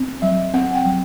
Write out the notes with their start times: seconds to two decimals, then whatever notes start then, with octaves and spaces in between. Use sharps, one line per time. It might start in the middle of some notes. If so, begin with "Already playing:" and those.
Already playing: C4
0.22 F#3 E5
0.54 C4 F#5
0.75 G5
0.86 F#3